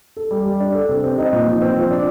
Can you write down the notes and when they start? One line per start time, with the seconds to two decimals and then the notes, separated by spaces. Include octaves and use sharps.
0.17 A4
0.31 G3
0.45 G3
0.60 D4
0.75 A4
0.89 C3
1.04 C4
1.18 D#4
1.33 A#2
1.47 F3
1.62 C4
1.76 F3
1.90 D4